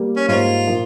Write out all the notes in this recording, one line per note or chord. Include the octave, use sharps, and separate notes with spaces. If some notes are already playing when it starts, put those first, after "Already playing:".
Already playing: G3 A#3
C#4
G#2 G3 A#3 C#4 F4
A#2 F3 A#3